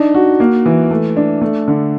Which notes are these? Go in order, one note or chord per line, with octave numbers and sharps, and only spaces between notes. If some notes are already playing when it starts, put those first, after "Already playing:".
Already playing: D4 D#4
F#4
A#3
E3
A3
D4
A3
D3